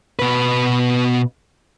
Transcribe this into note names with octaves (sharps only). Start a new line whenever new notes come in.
B2 B4